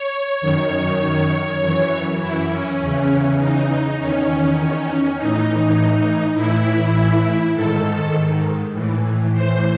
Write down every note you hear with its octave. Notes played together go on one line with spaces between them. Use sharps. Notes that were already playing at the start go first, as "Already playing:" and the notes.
Already playing: C#5
F#2 D#3
F#2 E3
E4
C#4
E2 C#3 E3
D#4
D#4
E2 D#3 C#4
A2 E3 D#4
A2 E3 E4
G#2 D#3 A4
A2 E3
C5